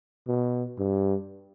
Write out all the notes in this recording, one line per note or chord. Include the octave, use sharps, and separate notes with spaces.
B2
G2